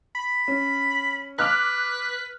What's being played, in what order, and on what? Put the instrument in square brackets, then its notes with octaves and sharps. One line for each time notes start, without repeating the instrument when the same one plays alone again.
[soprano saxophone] B5
[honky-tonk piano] C#4
[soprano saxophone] B4 [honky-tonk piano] D6 F6 F#6